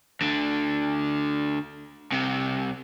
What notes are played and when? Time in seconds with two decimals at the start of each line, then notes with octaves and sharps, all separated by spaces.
0.21 D2 D3
2.12 C2 C3